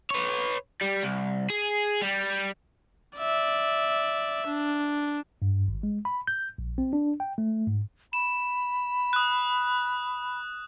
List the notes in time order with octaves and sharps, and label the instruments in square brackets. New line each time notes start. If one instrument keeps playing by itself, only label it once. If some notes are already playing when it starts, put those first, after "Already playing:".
[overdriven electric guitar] B4 C#5
G3
C2
G#4
G3
[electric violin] D5 E5
D4
[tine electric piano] G2
G#1
G#3
B5
G6
A#1
C4
D4
G5
A3
G#2
[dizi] B5 [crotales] E7
[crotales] D#6 F#6